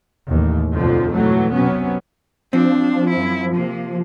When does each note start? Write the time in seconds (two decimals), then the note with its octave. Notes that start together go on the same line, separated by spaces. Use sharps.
0.28 A1 D#2
0.72 B1 F2 G#2 B2 D3 F3
1.12 B1 E3 F#3 A3
1.53 C3 F#3 B3 C#4
2.53 F3 C4 D4
3.10 F#2 E4
3.54 C3 A#3